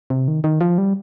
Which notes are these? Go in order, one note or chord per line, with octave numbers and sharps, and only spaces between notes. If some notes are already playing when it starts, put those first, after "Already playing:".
C3
D#3
D#3
F3
G3